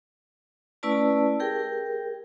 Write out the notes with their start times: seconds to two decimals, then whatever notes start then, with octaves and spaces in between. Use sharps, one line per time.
0.83 A3 C#4 E4 B4 D5 A5
1.40 G4 G#4 A#4 G5